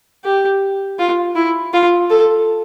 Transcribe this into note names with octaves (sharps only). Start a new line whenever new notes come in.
G4
F4
E4
F4
A4